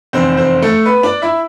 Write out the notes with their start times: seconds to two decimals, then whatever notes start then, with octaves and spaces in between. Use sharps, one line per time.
0.13 F1 E2 D3 C4 C5
0.37 C4 C5
0.62 A3 A4
0.85 B3 B4
1.03 D4 D5
1.22 E4 E5